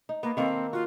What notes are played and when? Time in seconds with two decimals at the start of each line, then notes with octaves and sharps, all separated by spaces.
0.09 D#4
0.23 A#3 B3
0.37 D#3 A#3 C4 A4
0.73 F4 F#4